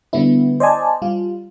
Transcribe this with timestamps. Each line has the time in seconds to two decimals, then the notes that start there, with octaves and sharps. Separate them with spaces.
0.13 D3 G3 B3 E4
0.60 C5 D5 D#5 G#5 A5
1.02 G3 F4